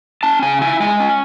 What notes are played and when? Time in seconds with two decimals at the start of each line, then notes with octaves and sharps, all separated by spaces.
0.23 C#4 A5
0.42 C#3 G#5
0.61 E4 G#5
0.80 G#3 G#5
1.00 C#4